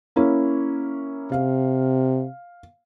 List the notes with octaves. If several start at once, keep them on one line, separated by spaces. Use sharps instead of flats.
A#3 C#4 E4
C3 F5